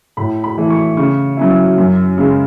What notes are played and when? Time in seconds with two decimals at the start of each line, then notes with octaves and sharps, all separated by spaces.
0.17 A2 B5
0.44 B5
0.58 E3 A3
0.70 C#6
0.97 C#3 C#6
1.37 F#3 C#4 E4
1.78 F#2
2.18 C#3 G#3